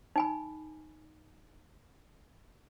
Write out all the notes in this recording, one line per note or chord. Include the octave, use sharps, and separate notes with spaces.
D#4 G#5 B5